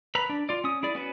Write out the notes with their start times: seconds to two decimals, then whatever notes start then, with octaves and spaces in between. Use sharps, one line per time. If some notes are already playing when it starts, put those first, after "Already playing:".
0.15 B4 A#5 B5
0.30 D4
0.49 F4 D5
0.64 C#4 D#6
0.83 E4 G#4 D5
0.95 B3 C#4 F#4 B4